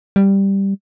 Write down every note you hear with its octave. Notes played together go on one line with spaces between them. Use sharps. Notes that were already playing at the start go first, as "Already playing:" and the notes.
G3